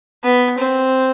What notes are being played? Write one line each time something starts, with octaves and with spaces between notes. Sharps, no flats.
B3
C4